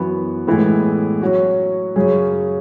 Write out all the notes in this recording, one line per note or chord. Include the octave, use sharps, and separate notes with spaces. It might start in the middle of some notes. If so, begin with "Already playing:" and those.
Already playing: F#2 E3 B3 F#4
A2 E3 G#3 B3
F#3 C#4 F#4
F#2 C#3 F#3 C#4 G#4